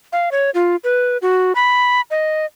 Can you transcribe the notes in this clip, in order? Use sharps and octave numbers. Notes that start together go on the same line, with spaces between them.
F5
C#5
F4
B4
F#4
B5
D#5